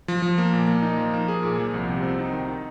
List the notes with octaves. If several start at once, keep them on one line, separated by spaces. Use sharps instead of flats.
F3
F3
A#3
A#2
A#3
D#4
F3
A#3
G#4
A#2
F3
C2
C3
C4
D#4
D#3
D#4